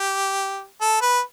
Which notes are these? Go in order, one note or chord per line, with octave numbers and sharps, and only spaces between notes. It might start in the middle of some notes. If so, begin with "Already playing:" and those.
Already playing: G4
A4
B4